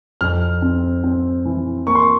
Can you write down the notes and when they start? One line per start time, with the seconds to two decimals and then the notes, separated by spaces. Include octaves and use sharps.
0.21 F2 F6
0.62 C4
1.04 C4
1.45 E3
1.87 A#3 C#6
1.95 C6